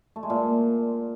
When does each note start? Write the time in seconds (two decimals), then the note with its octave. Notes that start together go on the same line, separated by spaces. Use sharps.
0.16 A3
0.23 G#3
0.30 A#2